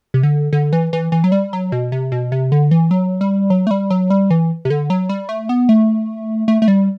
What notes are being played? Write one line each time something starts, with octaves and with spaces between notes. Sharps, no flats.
C3
D3
D3
E3
E3
E3
F#3
G3
F#3
B2
C3
B2
C3
D3
E3
F#3
G3
F#3
A3
G3
F#3
G3
E3
C3
D3
F#3
G3
A3
B3
A3
A3
A3
G3